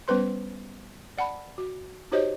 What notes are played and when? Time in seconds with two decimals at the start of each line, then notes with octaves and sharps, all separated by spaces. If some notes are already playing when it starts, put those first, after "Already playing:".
0.08 G3 B3 C#4 B4 C5 C6
1.17 D5 F#5 A5 B5
1.58 F#4
2.12 D#4 F#4 G4 C5 C#5 D#5